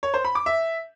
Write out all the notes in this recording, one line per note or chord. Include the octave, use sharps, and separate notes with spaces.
C#5
C5
B5
D6
E5